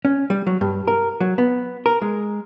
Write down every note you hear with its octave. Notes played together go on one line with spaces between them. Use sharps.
C#4
G3
F#3
G2
A#4
F#3
B3
A#4
G#3